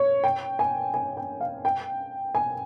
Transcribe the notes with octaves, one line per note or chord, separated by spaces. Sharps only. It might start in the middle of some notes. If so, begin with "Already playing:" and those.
Already playing: C#5
G5
G#5
G#5
G5
F5
G5
G#5